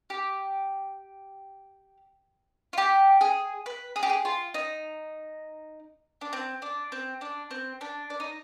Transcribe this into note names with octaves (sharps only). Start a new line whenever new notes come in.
G4
F4
G4
G#4
B4
G#4
G4
G#4
F4
D#4
D4
C4
D4
C4
D4
C4
D4
D4
D#4